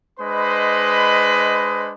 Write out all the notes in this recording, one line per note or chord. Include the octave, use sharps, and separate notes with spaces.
G#3 D4 B4 C5 D#5 B5